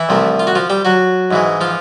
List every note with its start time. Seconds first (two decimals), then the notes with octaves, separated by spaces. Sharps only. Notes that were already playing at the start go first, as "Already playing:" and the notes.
Already playing: E3 E4
0.09 C2 C3 F3 A3
0.39 F4
0.47 F#4
0.55 F3 F4
0.70 G3 G4
0.85 F#3 F#4
1.31 G#2 E3 G#3
1.61 F3 F4